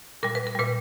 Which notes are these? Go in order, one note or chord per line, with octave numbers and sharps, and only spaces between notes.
A#2 G3 A#4
B4
A#4
A#2 G3 B4